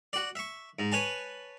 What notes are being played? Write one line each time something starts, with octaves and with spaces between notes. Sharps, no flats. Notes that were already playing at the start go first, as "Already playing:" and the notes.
F#4 D5
E5 C#6
G#2
B4 C#5 G#5 A5